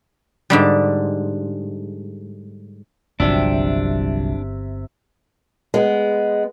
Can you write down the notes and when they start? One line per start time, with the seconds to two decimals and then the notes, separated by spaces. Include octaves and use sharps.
0.50 G#2 D3 G3
3.20 G1 C2 C3 F3 F#3 D4 E5
5.74 G#3 B3